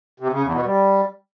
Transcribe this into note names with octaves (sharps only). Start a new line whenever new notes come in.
C3
C#3
E2
B2
G3